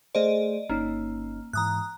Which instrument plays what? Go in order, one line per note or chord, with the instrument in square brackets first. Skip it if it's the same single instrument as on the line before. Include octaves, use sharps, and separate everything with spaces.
[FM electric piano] A3 G#4 C5 [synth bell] D5 D#5
[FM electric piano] G1 C#4 D#4 [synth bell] A#3
[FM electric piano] G#2 E3 [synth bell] A#5 D#6 F#6